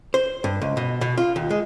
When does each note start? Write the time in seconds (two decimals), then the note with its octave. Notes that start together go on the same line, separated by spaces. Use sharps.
0.14 C5
0.44 G2
0.61 C#2
0.77 B2
1.01 B2
1.18 F4
1.36 D#2
1.50 G#3